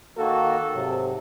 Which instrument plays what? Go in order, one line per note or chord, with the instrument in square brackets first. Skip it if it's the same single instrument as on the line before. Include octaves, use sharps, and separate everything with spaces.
[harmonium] D#3 A#3 F#4 [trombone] A4
[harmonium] G#2 C3 F#3